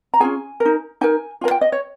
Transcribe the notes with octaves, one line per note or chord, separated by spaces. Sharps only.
A#5
C#4 F4 G#4 G#5
A#4
D#4
D#4 A#4 G#5
F4 A#4 G#5
G5
D#5
C#5